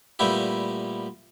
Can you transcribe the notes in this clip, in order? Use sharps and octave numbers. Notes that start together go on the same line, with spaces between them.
A#2 G3 A3 B3 E4 G4